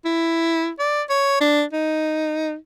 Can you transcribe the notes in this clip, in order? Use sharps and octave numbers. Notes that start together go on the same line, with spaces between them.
E4
D5
C#5
D4
D#4